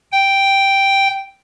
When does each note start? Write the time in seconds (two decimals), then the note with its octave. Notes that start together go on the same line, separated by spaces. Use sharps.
0.12 G5